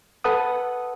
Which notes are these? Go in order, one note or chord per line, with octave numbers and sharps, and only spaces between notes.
A4 B4 F#5 D#6